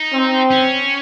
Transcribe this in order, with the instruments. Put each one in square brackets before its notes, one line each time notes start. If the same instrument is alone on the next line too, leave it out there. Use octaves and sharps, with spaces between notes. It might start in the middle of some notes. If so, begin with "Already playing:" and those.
Already playing: [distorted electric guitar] D#4
[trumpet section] C4
[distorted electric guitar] C#4